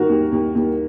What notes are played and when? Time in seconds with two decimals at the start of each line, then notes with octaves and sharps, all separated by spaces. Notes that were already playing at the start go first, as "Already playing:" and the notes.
Already playing: D#3 F#4 A#4
0.09 D#2
0.32 D#2
0.55 D#2